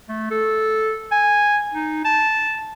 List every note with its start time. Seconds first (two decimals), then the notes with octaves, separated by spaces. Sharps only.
0.09 A3
0.31 A4
1.12 G#5
1.74 D#4
2.05 A5